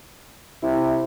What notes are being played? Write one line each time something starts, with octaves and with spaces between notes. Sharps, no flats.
C3 E4